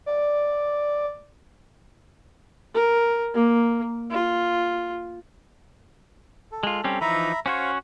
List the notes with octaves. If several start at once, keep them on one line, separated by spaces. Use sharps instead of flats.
D5
A#4
A#3
F4
A4
G#3 F4
G3 C4 C#4
E3 F3 D#4 E5 A#5 B5
C#4 F#4 C5 C#5 F5